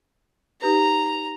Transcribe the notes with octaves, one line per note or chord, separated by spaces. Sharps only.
D#4 G4 B4 A#5